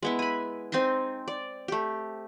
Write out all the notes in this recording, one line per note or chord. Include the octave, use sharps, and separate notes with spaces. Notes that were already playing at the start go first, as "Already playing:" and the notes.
G#3 B3 E4
G#5 B5
C4 D#4 G#5 C6
D5
A3 G4